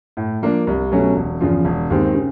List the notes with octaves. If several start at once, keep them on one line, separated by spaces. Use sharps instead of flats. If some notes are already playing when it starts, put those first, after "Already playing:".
A2
F3 A#3 D4
C2
B2 F#3 A3 C#4
E1
E2 C#3 F3
E1
D#2 D#3 G#3 C4
C#3